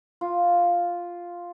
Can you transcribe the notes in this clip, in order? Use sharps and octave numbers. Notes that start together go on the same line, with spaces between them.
F4